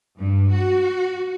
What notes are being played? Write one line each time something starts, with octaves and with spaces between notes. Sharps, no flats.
G2
F#4